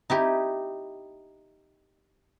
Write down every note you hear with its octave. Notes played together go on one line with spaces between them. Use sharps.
D#4 E4 G4